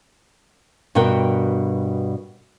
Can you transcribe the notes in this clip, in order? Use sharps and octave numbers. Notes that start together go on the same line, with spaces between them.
G2 B2 F#4 A#4 G5